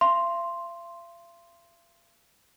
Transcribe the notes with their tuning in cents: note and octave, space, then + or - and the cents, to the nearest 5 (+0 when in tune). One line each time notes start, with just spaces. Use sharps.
F5 -45 C6 +0